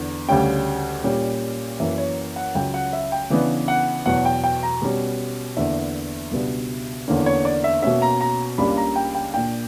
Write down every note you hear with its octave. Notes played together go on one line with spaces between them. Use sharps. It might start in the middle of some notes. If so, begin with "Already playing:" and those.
Already playing: E2 D3
D2 C#3 G3 C#4 G5
A#2 G3 C#4
F#2 E3 A#3 E5
C#5
F#5
C#2 C#3 F#3 C#4 G5
F#5
E5
G5
C#3 E3 B3 D4
F#5
E2 B2 F#3 F#5
G5
G5
A#5
B2 G3 C#4
E2 D3 A#3 D4 E5
C#2 B2 G3 B3 D4
E2 D3 A#3 C#4
C#5
D5
E5
B2 A#3 C#4 E5
A#5
A#5
C#2 C#3 G3 A#3 D4 B5
A#5
G5
G5
A#2 A#3 D4 G5